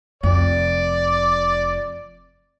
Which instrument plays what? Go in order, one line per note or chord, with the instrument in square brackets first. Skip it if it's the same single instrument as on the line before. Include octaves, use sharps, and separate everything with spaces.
[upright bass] F1 F2 [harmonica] D5